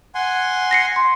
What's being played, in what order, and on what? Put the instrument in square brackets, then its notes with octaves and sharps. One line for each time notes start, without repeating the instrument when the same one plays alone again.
[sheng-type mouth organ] F#5 G#5 C6
[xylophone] A#6 C7 C#7
C6